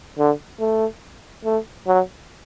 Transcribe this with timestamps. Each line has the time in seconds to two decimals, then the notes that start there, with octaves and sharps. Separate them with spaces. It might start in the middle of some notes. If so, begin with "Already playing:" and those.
0.18 D3
0.60 A3
1.45 A3
1.87 F#3